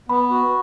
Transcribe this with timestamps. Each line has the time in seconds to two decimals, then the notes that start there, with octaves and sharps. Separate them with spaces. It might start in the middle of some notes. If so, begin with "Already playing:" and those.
0.09 B3 B5
0.30 F#4